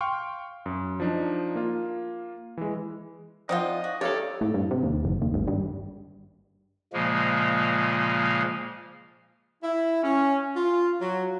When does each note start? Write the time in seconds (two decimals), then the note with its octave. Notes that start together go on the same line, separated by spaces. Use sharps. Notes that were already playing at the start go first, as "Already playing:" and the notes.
0.01 F5 G5 C6 C#6 F6
0.66 F#2
1.00 F3 D4 D#4
1.55 A#3 F4
2.57 E3 G#3
3.49 F3 C4 D#4 F4 D5 D#5 F#5
3.84 F#4
4.01 A3 G4 A4 C#5 D5 F5
4.41 A2
4.54 G2
4.71 C3
4.83 D#2
5.05 F#1
5.22 D#2
5.34 G#1
5.48 G2
6.93 A#2 C#3 F3 G#3 A#3
9.63 E4
10.03 C#4
10.56 F4
11.02 F#3